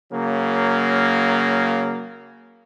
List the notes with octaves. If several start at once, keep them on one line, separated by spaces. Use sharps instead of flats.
C#3 F#3 A#3